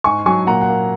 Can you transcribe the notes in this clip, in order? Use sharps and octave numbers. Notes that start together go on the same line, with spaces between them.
G#2 G#5 C#6
F#3 G#5 C#6
A#2 F#5 A#5
F#5
A#3